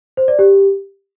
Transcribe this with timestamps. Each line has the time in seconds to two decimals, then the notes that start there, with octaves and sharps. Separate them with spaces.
0.17 C5
0.28 D5
0.39 G4